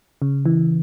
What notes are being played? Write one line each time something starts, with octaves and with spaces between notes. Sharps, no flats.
C#3
E3